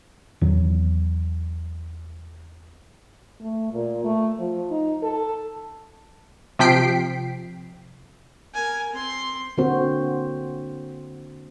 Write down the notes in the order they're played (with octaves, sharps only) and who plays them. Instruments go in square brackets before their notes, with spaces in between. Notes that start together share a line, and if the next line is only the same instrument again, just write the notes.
[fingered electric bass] E2 D#3 F#3
[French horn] A3
A#2
A3
F3
D#4
A4
[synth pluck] C3 F3 G5 B6 C7 D7
[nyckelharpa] A#4 G#5
C4 C6
[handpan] D3 A#3 C4 F#4 C5